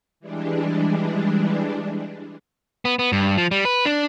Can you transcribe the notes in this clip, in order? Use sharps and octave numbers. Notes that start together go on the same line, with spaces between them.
E3 G3 G#3 D4
B3
B3
G2
F3
G3
B4
D4